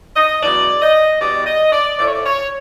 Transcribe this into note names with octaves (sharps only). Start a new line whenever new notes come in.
D#5
E2 C#3 F#3 D5
D#5
E2 B2 G3 D5
D#5
D5
A2 F3 A3 D5
C#5
D5
C#5